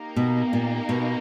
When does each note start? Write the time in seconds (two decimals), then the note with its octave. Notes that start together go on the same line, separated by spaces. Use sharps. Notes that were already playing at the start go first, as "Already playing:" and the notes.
Already playing: A#3 D#4 G4 A#4
0.16 B2
0.53 A#2
0.89 B2